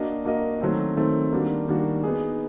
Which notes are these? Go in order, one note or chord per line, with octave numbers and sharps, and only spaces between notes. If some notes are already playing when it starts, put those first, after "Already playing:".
Already playing: A#3 D4 F#4 A#4 D#5
A#3 D4 F#4 A#4 D#5
D#3 F#3 A3 C4
D#3 F#3 A3 C4
D#3 G3 A#3 D4 F#4
D#3 G3 A#3 D4 F#4
B3 D#4 G#4